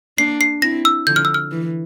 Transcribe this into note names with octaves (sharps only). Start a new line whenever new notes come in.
A#3 D4 C7
C7
C4 E4 A#6
E6
D3 F3 G6
F6
E6
F6
E3